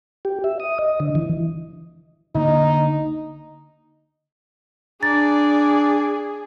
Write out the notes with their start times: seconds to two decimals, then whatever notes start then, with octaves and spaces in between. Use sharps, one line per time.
0.25 G4
0.44 E5
0.60 D#6
0.79 D#5
1.00 D3
1.15 E3
2.35 D3 A#3 D#4
5.02 D4 G#4 D5 A#5 A6